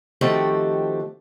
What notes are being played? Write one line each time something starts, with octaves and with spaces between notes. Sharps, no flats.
D#3 F3 A3 C4 F#4 G4